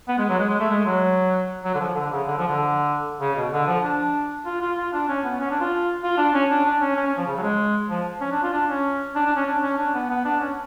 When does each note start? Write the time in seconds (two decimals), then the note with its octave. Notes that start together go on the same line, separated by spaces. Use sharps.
0.08 B3
0.18 G#3
0.29 F#3
0.39 G#3
0.49 G#3
0.60 A3
0.71 G#3
0.86 F#3
1.64 F#3
1.75 D3
1.80 F3
1.95 D3
2.06 D3
2.11 C#3
2.27 D3
2.37 F3
2.47 D3
3.21 C#3
3.36 B2
3.52 D3
3.67 F3
3.83 D4
4.45 F4
4.61 F4
4.78 F4
4.93 D4
5.08 C#4
5.24 B3
5.40 C#4
5.50 D4
5.60 F4
6.03 F4
6.17 D4
6.34 C#4
6.50 D4
6.65 D4
6.81 C#4
6.96 C#4
7.06 C#4
7.17 F3
7.27 C#3
7.37 F#3
7.42 G#3
7.90 F3
8.21 C#4
8.31 D4
8.43 F4
8.53 D4
8.69 C#4
9.15 D4
9.25 D4
9.36 C#4
9.46 D4
9.62 C#4
9.78 D4
9.94 B3
10.09 B3
10.25 D4
10.40 C#4